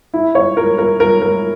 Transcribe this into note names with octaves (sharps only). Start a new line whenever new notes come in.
E4
C#5
A#4
A#4
A#4
A#4